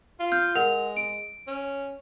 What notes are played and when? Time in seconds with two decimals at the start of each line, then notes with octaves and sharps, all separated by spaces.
0.19 F4
0.32 F6 G6
0.55 G#3 A#4 F#5 F7
0.97 D7
1.47 C#4